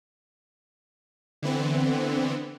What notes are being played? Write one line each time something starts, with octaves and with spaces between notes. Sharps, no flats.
D3 E3 B3 C4